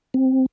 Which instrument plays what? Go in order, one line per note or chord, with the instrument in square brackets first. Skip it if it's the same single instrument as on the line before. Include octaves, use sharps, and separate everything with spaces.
[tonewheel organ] C4